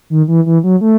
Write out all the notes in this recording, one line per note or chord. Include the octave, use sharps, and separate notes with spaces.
D#3
E3
E3
F#3
A3